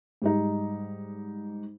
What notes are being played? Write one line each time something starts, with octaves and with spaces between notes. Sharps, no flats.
G#2 G3 D#4